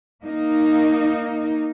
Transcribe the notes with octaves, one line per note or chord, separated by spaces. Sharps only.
A#3 D#4